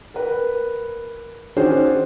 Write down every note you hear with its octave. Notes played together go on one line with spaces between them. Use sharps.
A#4 B4
D#3 C#4 D4 F#4 G#4 C5